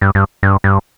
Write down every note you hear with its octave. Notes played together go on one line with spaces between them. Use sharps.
G2
G2
G2
G2